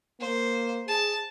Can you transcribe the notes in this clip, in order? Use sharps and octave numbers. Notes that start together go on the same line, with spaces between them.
A#3 C5
G#4 A5